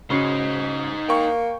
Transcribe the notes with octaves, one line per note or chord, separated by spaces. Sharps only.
C#3 D#4 F#4 C5
A#3 G5 C#6